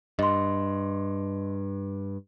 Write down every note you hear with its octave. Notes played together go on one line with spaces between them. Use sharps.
G2 D#5 C6